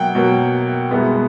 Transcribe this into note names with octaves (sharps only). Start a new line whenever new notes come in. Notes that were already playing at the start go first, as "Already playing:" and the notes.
Already playing: B2 F#3 A#3 F#5 G5
B2 F#3 A#3
C2 B2 G#3 B3